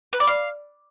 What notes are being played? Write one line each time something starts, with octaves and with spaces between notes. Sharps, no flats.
B4
D5
F5